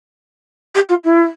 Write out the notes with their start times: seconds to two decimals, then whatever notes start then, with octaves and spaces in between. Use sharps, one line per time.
0.75 G4
0.89 F4
1.04 E4